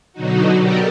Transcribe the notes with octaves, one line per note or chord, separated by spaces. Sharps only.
B2 D3 F#3 D#4 F#4
B3 G4 A4 A#4 D5 D#5